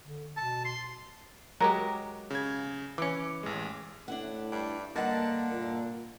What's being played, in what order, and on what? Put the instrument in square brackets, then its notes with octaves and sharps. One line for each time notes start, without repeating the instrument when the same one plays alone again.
[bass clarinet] D3
[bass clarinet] B2 [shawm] A5
[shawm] C6
[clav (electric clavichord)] F#3 G#3 G4 [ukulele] A#4
[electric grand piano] C#3 G#6
[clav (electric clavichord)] E3 C#4 [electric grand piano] D6 C#7
[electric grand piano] A1 G#3
[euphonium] A2 [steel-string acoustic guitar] D4 E4 F#5
[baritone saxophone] G2 [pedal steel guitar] D5
[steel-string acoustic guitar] G2 D#5 F#5 [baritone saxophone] D3 [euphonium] A#3 [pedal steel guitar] A#4 A5
[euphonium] A#2